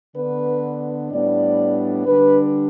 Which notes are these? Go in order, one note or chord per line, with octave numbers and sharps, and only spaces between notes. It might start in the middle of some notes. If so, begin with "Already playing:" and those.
D3 B3 D4 B4
A2 G3 B3 D4 D5
D3 G3 D4 B4